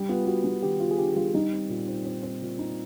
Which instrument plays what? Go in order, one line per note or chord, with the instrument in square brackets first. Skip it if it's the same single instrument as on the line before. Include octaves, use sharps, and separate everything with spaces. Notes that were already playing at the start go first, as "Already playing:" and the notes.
Already playing: [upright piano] G3
[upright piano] B3 [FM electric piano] F4
[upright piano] B3 [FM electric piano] F#4
[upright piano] G3
[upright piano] D#3 [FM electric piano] G4
[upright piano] B3 [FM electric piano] F4
[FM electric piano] G#4
[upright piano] D4 [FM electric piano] G4
[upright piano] G3 [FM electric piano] F4
[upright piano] G3 [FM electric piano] D#4
[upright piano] C4
A#2
C4
C4
C4
A#2
D#4